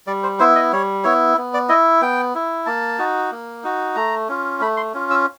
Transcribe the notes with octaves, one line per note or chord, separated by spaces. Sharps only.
G3 D5
C5
B3 E4 C5
D#5
G3 C#5
B3 E4 C#5
B3
D5
E4 D#5
B3 G5
E4
A#3 A5
D#4 F#4
A#3
D#4 F#4
A3 A#5
C#4 F4
A3 B5
C6
C#4 F4
E6